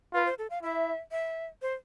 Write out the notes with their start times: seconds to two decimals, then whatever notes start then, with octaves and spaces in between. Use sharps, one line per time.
0.13 F4 B4
0.26 C5
0.38 A4
0.50 F5
0.63 E4 E5
1.11 E5
1.62 C5